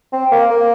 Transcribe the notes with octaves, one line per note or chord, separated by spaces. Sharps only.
C4
A#3
A#3